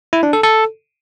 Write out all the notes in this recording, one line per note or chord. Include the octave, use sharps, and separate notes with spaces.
E4
D4
A4
A4